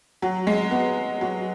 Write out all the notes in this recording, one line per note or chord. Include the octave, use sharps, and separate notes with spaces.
F#3
G#3
B3
F#3